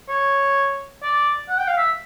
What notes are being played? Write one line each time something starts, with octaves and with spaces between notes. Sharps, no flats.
C#5
D5
F#5
G5
F5
E5